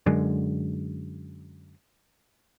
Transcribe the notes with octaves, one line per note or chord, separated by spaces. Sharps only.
F#2 D3 G#3